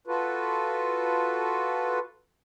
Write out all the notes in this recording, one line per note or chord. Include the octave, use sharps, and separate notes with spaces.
F4 F#4 A4 B4